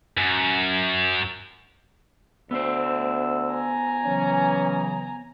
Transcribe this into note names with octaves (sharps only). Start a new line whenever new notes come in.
F#2
D2 B3 C5 E6
G#5 A#5
C#3 E3 F#3 C#4